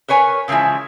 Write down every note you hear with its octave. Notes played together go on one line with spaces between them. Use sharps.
A#4 B4 C#5 G#5
C#3 E3 F3 G#3 E4